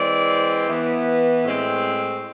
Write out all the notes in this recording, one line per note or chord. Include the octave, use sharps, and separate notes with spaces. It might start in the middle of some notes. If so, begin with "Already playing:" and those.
Already playing: E3 G#3 C4 D5
E3 B3
A2 G#3 C4